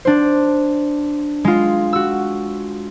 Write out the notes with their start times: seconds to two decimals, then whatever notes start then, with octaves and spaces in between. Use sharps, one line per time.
0.05 D4 C5
1.44 G#3 F4
1.93 F#4 E6